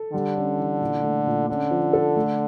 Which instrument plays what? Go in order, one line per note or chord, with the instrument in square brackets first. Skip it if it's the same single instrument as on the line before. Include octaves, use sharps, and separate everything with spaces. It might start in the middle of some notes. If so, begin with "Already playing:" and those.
Already playing: [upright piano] A4
[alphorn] D3 [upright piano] G3
[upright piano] C#4
E3
A#2
A3
A#2
[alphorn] D3 [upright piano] C#4
[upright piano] F3
A4
A3